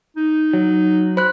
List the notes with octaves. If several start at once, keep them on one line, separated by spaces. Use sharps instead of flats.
D#4
F#3
C5 B5 F#6